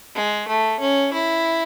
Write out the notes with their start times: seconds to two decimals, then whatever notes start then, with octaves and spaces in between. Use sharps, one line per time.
0.15 G#3
0.48 A3
0.80 C#4
1.13 E4